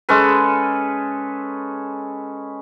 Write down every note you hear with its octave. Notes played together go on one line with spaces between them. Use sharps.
G#3 C#4 A4 B4